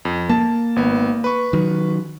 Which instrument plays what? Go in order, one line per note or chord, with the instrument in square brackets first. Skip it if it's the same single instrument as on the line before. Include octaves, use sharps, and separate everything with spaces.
[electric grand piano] F2
[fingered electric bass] A#3 [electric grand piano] A5
[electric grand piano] G#1 B3
B4 C#6
[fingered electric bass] D#3 F#3